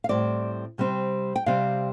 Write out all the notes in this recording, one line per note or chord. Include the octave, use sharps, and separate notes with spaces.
F5
A2 G3 C4 D5
C3 G3 C4
G5
C3 G3 C4 F5